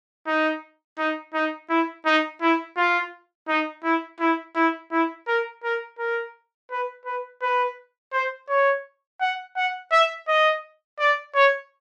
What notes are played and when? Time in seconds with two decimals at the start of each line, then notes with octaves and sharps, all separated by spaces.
0.26 D#4
0.98 D#4
1.34 D#4
1.70 E4
2.06 D#4
2.42 E4
2.77 F4
3.48 D#4
3.84 E4
4.20 E4
4.55 E4
4.92 E4
5.27 A#4
5.64 A#4
5.98 A#4
6.71 B4
7.05 B4
7.42 B4
8.13 C5
8.49 C#5
9.21 F#5
9.56 F#5
9.92 E5
10.28 D#5
10.99 D5
11.35 C#5